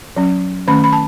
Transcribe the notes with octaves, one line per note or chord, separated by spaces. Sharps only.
F#3 C#4
D#3 A3 C#4 B5
B5
A5